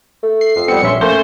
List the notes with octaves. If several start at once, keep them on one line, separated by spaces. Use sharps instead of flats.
A3
C7
F2
G3 B3 C4 C#7
A#1 C#4 E5 C6
A3 A#3 C#4 C5